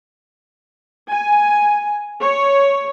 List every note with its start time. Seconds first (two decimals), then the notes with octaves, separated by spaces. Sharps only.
1.10 G#5
2.21 C#5